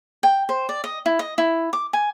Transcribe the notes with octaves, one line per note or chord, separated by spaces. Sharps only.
G5
C5
D5
D#5
E4
D#5
E4
D6
G#5